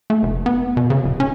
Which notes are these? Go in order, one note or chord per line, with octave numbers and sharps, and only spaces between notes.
A3
F1
B3
B2
C#3
D1
C#4